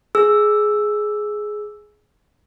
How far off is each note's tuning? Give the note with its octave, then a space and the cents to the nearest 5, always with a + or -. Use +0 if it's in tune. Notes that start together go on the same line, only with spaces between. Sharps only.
G#4 +15 E6 +0